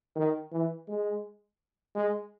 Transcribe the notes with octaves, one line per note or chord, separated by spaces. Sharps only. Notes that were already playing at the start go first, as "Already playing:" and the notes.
D#3
E3
G#3
G#3